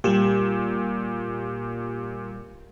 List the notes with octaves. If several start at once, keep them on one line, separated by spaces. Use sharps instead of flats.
A#2 G3 G4 E7